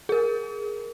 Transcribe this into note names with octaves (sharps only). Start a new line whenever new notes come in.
G#4 A#4